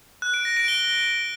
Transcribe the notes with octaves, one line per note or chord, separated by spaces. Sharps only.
F#6
D7
A#6
D7
G7